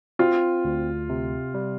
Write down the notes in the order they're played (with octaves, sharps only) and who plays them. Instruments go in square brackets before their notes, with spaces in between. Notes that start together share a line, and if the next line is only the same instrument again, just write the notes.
[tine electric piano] C4 [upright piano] F4
[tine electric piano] D2
C3
G3